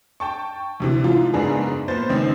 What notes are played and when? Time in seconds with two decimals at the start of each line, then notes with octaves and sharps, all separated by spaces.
0.20 G5 A5 C#6
0.80 D2 C3 E3
1.04 G#2 E3 F3 F4
1.34 F#1 G#2 B3 D4 G#4
1.88 A#2 B3 C5 A6
2.09 C#2 D#3 C4 C#4